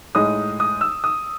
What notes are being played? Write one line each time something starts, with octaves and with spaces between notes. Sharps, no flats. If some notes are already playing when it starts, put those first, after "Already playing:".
A2 G#3 D#4 D#6
D#6
E6
D#6